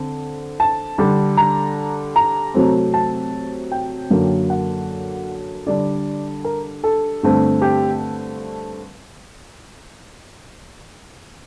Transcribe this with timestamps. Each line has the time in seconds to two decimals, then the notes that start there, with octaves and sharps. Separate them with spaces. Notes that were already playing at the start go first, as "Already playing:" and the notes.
Already playing: D3 C4
0.60 A5
0.98 D3 G3 D4
1.37 A#5
2.16 A#5
2.54 C3 F#3 A3 C4
2.94 A5
3.72 G5
4.11 F#2 D3 F#3 A#3
4.50 F#5
5.66 D3 G3 D4 D5
6.44 A#4
6.84 A4
7.23 G2 D3 A3 C4
7.62 G4